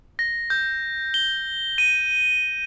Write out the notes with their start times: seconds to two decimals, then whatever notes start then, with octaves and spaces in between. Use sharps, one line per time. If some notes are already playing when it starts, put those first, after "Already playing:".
0.19 A#6
0.50 G6
1.14 G7
1.78 D#7